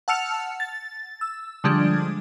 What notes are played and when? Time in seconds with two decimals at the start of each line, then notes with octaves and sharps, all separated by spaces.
0.08 F#5 A5 E6 F6 C#7 F7
0.60 A6
1.21 E6
1.64 D3 F3 G3 G#3 D4